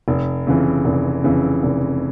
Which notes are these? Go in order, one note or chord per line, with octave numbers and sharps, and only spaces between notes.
F1
F2 C#3 E3
F1
F2 C#3 E3
F1